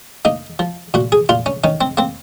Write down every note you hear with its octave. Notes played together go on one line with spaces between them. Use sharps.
A#3 D#4
F3
A#2 F#4
G#4
A#2 F4
C#4
D#3 C#4
C4
A#3 C4